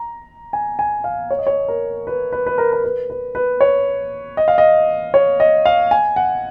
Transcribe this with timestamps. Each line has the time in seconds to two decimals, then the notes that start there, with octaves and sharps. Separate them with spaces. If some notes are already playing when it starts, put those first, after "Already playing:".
Already playing: A#5
0.53 G#5
0.79 G#5
1.04 F5
1.31 C#5
1.39 D#5
1.47 C#5
1.68 A#4
2.07 B4
2.32 B4
2.47 B4
2.58 A#4
2.73 A#4
2.84 B4
3.10 B4
3.35 B4
3.61 C#5
4.37 D#5
4.48 F5
4.58 D#5
5.14 C#5
5.40 D#5
5.65 F5
5.91 G#5
6.16 F#5